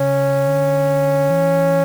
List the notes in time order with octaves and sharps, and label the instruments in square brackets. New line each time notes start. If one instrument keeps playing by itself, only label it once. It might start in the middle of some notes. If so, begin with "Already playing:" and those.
Already playing: [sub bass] C#3 [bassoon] C#4
[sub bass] D3
E3